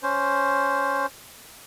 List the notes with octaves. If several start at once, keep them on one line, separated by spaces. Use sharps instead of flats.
C#4 C5